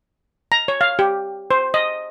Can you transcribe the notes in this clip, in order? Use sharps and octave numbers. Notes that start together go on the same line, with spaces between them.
A#5
C#5
F5
G4
C5
D#5